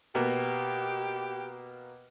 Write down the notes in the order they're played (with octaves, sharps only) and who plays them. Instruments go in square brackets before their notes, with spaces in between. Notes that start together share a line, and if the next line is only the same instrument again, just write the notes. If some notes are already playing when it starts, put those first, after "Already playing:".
[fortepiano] B2 A#3 B3 [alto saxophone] G4